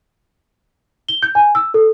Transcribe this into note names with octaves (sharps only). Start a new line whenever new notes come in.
G7
G6
G#5
E6
A4